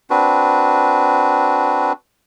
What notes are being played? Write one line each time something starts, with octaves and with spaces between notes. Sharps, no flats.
C4 D4 F#4 B4